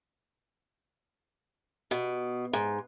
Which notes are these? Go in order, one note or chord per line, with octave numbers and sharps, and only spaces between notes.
B2
G#2